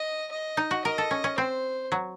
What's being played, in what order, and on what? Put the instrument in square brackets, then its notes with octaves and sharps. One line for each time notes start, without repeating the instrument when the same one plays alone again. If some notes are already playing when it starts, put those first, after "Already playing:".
Already playing: [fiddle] D#5
D#5
[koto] D#4
F#4
[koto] A#4 [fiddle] D#5
[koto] A4
C#4
C#4
[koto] C4 [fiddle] C5
[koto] F#3